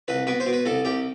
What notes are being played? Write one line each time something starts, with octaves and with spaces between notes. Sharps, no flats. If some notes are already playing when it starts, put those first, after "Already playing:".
C2 B4
B2 B4
C5
B2
B4
C2 A4
C2 G4